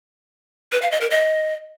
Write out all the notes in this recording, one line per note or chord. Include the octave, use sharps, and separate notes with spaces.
B4
F5
D#5
A#4
D#5